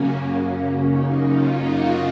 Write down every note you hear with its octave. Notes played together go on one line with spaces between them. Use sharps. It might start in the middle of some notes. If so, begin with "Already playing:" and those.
Already playing: F#2 C#3 F#3 A#3 C#4
D#4
F4
F#4